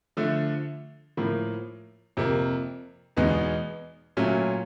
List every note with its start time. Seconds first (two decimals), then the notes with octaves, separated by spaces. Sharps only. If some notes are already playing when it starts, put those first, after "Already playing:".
0.17 D3 F3 A3
1.17 A2 F3 A#3
2.17 F2 C3 F3 A#3
3.17 E2 B2 G#3 B3 D#4
4.17 A#2 F#3 A3 C#4 F4